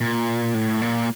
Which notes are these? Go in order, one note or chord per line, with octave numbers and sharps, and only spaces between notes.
A#2
A2
A#2